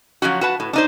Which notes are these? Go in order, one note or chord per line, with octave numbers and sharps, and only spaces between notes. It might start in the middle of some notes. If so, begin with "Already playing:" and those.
F3 F#3 C#4 F#4
F#4 B4 A5
A2
D4 D#4 C5